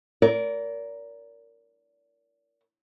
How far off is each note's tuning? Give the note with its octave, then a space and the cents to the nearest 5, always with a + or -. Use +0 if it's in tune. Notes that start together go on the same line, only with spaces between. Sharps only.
A#4 +0 D5 -35